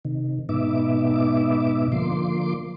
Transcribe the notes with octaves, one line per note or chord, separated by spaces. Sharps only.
C3 D#3
G#2 B2 B3 D#4 E5 D6
D3 F3 A#3 C6 D6